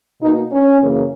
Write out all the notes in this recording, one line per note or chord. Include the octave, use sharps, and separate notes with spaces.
B2 A#3 D#4
C#4
F#2 C#3 E3 A#3